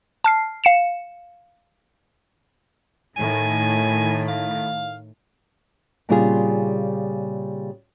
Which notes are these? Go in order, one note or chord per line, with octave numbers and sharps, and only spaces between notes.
A5 F6 C7
F5 C#7 E7
A2 D#3 G#5
F5
A#2 C#3 G3 C4 F4 G#4